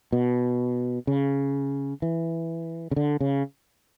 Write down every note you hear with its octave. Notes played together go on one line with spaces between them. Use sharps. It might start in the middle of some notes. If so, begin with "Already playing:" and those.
B2
C#3
E3
C#3
D3
C#3